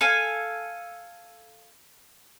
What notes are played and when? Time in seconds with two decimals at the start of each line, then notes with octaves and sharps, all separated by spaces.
0.01 A4 F5 G#5